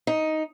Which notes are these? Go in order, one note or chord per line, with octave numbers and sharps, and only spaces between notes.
D#4